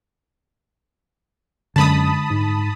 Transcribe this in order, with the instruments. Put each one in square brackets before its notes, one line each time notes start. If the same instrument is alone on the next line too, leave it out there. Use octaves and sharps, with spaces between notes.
[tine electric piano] F#2 [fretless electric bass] D3 G#3 [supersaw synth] A5 B5 D#6
[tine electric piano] G#2